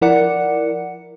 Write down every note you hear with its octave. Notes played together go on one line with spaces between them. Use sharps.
F3 E4 A#4 D5 F#5 C#7